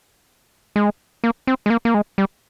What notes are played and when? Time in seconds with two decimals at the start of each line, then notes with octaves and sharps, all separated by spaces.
0.76 G#3
1.24 A#3
1.47 C4
1.66 G#3
1.70 A#3
1.85 A#3
1.94 G#3
2.18 G3